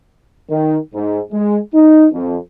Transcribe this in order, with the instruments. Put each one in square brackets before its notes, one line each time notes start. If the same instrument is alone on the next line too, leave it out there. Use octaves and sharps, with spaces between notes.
[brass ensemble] D#3
G#2
G#3
D#4
F2